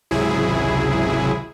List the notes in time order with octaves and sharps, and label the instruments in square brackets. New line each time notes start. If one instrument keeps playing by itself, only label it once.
[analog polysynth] G#1 C#2 C3 F#3 E4 G#4